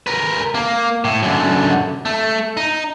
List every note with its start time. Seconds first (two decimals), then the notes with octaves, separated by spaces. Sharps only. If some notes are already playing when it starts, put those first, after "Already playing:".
0.07 A#4 B4
0.54 A#3
1.04 A2
1.23 F#2 D3
2.06 A3
2.57 D#4